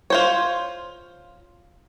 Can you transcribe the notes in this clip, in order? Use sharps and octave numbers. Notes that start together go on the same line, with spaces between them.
F4 C5 C#5